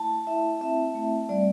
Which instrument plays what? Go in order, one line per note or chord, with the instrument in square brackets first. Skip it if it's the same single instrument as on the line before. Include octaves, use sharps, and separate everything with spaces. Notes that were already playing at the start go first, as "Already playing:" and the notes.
Already playing: [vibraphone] A3 E4 A5
E4 E5
C4 E5
A3
G3 D5